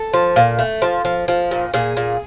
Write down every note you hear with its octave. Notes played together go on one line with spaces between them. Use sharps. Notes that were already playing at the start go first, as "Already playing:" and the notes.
Already playing: A4
F3
A#2
A3
F3
F3
F3
A#2
A#2 G#4
A#2